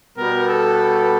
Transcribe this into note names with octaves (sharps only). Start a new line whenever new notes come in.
B2 G3 B3 A#4
A4